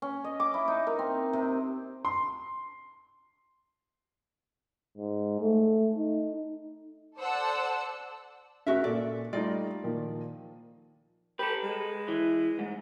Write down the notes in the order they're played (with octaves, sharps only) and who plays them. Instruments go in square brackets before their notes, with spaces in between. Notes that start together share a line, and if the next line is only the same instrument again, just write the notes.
[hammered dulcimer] C#4
D#5
D6
E4
D#4
A#4
C4
C3
[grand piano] C6
[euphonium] G#2
A3
D#4
[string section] A4 C5 D5 F#5 A5 E6
[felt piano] C#3 C#4 [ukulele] F#4 A#4 E5
[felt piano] A#2 A4 [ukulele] D5
[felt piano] G3 A3 D#4 [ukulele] F4 D5 D#5
[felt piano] A#2 D#3 F3
[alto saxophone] G4 [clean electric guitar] A4 B4
[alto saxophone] G#3
[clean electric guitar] E3
G#2